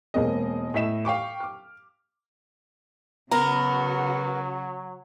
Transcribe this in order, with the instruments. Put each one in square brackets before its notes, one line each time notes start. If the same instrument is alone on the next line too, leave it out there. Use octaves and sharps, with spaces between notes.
[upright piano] E1 G#3 A#3 C4 D#5
A2 D#5 E5 B6 E7
F5 G5 C#6 D6
D6 F6
[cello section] C#3 F#4 [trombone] F#3 [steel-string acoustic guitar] B3 A#4 [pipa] A#5